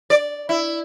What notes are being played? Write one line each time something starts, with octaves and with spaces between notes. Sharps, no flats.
D5
E4